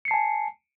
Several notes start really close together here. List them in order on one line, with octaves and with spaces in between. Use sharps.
C#7 C7 A5 G#5